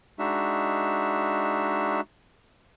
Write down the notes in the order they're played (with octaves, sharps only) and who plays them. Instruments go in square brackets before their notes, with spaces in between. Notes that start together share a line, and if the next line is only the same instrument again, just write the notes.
[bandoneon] G#3 D4 D#4 F#4 E5